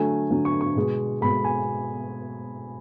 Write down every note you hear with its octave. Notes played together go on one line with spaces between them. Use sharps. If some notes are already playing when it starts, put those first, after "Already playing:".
Already playing: D3 F#3 A3 G#5
D3 F#3 A3
C#6
C#6
B2 G#3
B2 G#3 B5
G#5